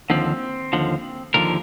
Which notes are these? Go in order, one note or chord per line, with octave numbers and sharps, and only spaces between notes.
D#2 D3 F3 C4
D#2 D3 F3
D#2 D3 F3 A#4